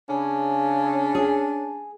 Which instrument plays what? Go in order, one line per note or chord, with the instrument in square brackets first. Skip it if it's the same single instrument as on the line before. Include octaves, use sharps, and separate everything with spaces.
[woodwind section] C#3 [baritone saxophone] C#4 [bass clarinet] D4
[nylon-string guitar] G#4